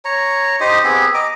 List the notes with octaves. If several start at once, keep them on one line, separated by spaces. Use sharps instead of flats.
C#5 A#5
D#4 G4 C5 D#5
B3 C4 G4 G#4
D#5 A#5 D6